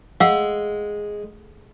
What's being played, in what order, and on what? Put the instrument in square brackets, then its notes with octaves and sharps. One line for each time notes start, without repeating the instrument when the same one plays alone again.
[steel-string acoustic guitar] G#3 [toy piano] F5 F#5 E6